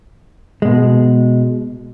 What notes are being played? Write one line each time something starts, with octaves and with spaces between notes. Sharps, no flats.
B2 G#3